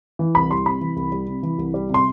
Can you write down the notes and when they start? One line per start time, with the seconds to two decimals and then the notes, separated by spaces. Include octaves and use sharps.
0.19 E3
0.35 C2 B5
0.50 G3 C6
0.66 C3 B5
0.81 E3
0.96 C2
1.12 G3
1.28 C3
1.43 E3
1.58 C2
1.74 G3
1.89 C3 C6